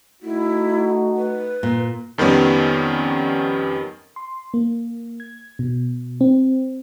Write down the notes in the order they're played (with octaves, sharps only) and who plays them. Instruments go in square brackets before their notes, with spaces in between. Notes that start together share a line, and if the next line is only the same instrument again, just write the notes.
[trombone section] A3 D#4 F#4 [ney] E4
[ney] B4
[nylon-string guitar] A#2
[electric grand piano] F2 D#3 G3 B3 C#4
[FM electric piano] C6
A#3
G#6
B2
C4